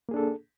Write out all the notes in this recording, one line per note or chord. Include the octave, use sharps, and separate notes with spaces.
A#3 D4 G#4 A4